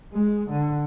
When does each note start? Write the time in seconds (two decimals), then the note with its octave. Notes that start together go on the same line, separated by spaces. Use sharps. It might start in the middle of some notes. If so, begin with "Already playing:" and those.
0.13 G#3
0.50 D3